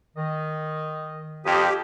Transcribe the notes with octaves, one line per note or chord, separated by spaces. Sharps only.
D#3 D#5
F2 G4 D#6